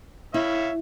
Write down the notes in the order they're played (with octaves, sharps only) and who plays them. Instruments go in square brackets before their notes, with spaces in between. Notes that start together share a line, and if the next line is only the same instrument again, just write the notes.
[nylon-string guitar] E4 [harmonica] C#5 E5 F5